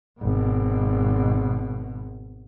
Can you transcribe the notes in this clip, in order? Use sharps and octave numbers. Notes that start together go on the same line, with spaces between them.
G#1 B2